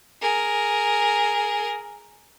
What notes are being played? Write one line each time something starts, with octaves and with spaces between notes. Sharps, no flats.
G#4 A#4